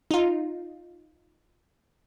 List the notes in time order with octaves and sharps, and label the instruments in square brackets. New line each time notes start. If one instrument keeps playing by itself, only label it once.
[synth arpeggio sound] D#4 F4